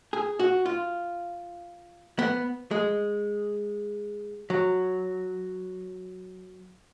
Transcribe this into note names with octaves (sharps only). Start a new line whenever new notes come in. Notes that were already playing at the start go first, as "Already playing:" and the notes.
G#4
F#4
F4
B3
G#3
F#3